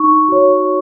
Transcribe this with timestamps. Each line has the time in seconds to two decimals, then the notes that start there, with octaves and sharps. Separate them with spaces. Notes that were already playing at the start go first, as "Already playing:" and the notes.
Already playing: D#4 C#6
0.28 F#4 C#5